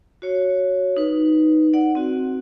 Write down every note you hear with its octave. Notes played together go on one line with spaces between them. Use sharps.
F#4 C#5
D#4 B4
D5 F#5
C4 F#4